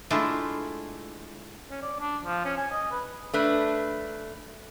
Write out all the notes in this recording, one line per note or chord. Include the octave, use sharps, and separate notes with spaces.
G#3 A3 D4 E4 F4
C#4
D5
D4
F3
C#4
G#5
D#5
B4
A3 D4 B4